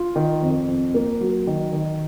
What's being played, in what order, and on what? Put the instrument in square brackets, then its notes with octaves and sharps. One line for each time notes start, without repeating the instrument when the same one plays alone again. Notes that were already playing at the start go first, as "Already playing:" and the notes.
Already playing: [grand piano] F4
D#3
F2
F2
A#3
F#3
D#3
D#3